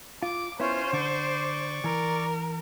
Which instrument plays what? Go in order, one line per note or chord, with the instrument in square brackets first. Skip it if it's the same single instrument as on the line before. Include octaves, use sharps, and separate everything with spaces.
[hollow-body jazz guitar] F4 [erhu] D6
[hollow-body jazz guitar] B3 E4 [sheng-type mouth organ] C#4 F4 C#5 [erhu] C5
[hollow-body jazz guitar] D3 [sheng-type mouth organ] D5 C#6 D6
[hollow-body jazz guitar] E3 [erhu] A#4